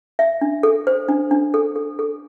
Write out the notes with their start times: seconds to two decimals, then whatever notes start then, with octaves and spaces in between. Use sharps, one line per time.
0.19 E5
0.41 D4
0.63 A4
0.87 C5
1.09 D4
1.31 D4
1.54 A4
1.76 A4
1.99 A4